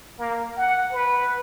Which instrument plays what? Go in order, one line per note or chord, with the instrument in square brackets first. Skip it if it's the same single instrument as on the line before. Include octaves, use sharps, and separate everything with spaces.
[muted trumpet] A#3
F#5
B4